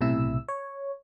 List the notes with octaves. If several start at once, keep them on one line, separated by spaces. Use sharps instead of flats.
B1 A2 C3 E4 E6
C#5